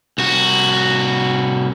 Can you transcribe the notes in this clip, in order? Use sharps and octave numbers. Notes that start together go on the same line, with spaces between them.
C2 F#4